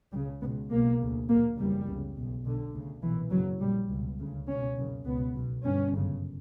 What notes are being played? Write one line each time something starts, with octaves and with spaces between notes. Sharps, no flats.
C#2 C#3 G3
C#2 B2 B3
B1 B2 A#3
D2 C#3
A#1 A#2 A#3
F#1 E2 C#3 G3
C#2 C#3
B1 B2
B1 B2 D3
D2 C#3
B1 A#2 E3
F#1 F#2 C#3 F#3
A#1 A#2 G3
C#2 B2
D2 C#3
C#2 B2 C#4
F#1 F#2 C#3
C#2 B2 B3
B1 B2
G1 G2 C#4
G1 F#2 C#3